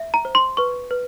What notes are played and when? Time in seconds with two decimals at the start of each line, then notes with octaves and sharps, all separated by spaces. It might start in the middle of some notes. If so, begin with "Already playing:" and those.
Already playing: E5
0.14 A#5
0.25 C5
0.35 C6
0.57 B4 C#6
0.91 B4